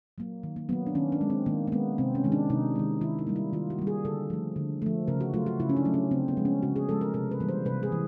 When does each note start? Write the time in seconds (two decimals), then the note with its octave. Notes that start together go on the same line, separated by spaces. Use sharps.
0.18 F#3 A#3
0.43 D#3
0.56 A#3
0.69 F#3 A#3 B3
0.87 D4
0.95 D#3 C#4
1.12 D4
1.21 G#3
1.30 C4
1.46 D#3 A#3
1.67 A#3
1.72 G#3 B3
1.98 C3 C4
2.15 C#4
2.24 D#3 G#3
2.32 D4
2.50 C3 D#4
2.76 D#3 G#3
3.01 D#3 E4
3.19 D#4
3.27 G3 A#3
3.36 E4
3.53 D#3 F4
3.70 F#4
3.79 G3 A#3
3.87 G#4
4.05 D3 A4
4.30 F3 A3
4.56 D3
4.82 F3 A3
5.08 C#3 A#4
5.21 F#4
5.34 F#3 A3 F4
5.46 F#4
5.60 C#3 E4
5.69 C#4
5.77 D4
5.85 F#3 A3
5.94 C#4
6.11 C#3 C4
6.28 B3
6.37 F3 G#3
6.45 C#4
6.62 C#3 F#4
6.76 G#4
6.89 F3 G#3 A4
7.01 A#4
7.14 C3 A#4
7.31 B4
7.40 E3 G3 A#3
7.49 C5
7.65 C3 B4
7.83 G#4
7.92 E3